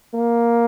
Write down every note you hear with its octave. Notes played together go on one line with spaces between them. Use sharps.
A#3